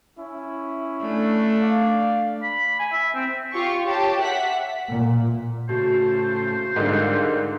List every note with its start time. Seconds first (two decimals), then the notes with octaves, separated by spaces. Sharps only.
0.18 C#4 E4
1.02 A3 D4
1.62 D5 F5
2.42 B5
2.79 G#5
2.92 E5
3.14 C4
3.53 F4 G4 C#6
3.84 G4 C#5 A5
4.19 E5 F#5 B6
4.90 A#2
5.69 A2 C#3 A3 F#4 C5
6.76 G#2 D3 G3 F4 A#4